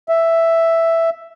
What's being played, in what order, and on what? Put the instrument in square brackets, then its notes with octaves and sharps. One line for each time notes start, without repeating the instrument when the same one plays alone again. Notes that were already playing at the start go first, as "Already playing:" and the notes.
[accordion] E5